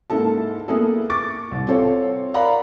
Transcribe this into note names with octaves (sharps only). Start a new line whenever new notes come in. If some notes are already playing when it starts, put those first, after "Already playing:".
G#2 A#3 E4 A4 A5
A#3 B3 E4 G#4 A4
C#6 D6 A6
C2
C4 F4 A4 C#5
A#4 D5 F5 F#5 A#5 B5